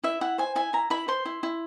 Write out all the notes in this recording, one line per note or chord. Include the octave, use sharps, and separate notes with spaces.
E4 E5
E4 F#5
C5 G#5
E4 G#5
E4 A#5
E4 B5
C5 C6
E4
E4